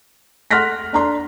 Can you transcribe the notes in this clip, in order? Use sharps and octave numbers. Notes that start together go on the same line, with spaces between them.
F#5 C6 F6 F#6 A#6 B6
D4 A#5 C6